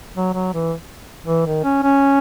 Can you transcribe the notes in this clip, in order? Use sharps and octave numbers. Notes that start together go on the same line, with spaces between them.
F#3
F#3
E3
E3
D#3
C#4
C#4